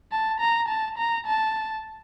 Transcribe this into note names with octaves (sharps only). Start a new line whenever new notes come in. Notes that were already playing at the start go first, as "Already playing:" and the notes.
A5
A#5
A5
A#5
A5